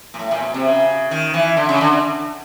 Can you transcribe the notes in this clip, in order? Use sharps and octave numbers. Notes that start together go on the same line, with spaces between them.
A#2
A2
A#2
B2
C3
C#3
D#3
E3
D3
C#3
D3
D3